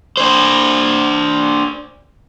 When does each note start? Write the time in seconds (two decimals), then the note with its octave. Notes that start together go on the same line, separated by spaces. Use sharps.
0.17 D4 C5